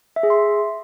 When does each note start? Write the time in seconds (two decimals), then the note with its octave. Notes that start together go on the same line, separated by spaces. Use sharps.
0.16 E5
0.23 G#4
0.30 C6